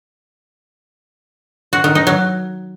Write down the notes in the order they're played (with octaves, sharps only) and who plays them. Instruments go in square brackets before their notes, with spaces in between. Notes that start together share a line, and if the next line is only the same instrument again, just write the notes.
[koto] F#4
D#3
D#4
F#3